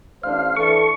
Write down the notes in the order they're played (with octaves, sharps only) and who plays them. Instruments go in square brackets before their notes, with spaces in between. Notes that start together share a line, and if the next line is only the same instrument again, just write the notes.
[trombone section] A1 D4 C5 [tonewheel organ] F5
[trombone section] E3 D4 A4 [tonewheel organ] C#6